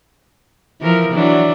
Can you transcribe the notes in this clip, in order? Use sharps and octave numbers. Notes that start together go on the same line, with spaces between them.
E3 F3 A#4
E3 F#3 D4